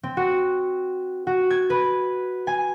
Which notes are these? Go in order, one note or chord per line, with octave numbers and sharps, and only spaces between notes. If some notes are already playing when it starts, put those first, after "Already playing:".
C4
F#4
F#4
G#6
B4
G#5